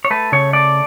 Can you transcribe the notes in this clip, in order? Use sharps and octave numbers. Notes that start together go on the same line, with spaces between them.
C#5
A3 B4
C#3 C#5
A3 D5